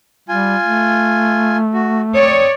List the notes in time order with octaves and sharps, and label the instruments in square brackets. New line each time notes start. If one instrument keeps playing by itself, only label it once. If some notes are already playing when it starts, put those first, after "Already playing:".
[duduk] G3 [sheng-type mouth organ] F4 G#5
[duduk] A3
[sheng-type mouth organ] F#4
[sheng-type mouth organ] C4 D#6 [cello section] C#5 D5